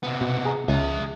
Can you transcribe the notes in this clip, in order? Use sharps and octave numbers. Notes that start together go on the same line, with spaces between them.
C3 B3
B2
G#4 A#5
C#2 G#4 E5